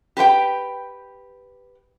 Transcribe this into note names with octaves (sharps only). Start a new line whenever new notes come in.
G4 B4 C5 G5